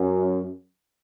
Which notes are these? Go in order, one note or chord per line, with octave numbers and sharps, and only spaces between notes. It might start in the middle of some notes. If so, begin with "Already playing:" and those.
Already playing: F#2